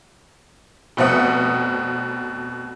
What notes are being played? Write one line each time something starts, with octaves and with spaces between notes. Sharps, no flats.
F1 B2 C4 F#5 D#6